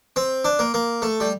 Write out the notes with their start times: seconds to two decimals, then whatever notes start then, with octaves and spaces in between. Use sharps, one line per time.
0.16 C4
0.45 D4
0.59 A#3
0.74 A#3
1.02 A3
1.20 G3